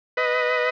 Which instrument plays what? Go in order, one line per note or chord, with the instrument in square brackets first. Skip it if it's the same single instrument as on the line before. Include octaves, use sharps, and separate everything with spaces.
[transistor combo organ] B4 D#5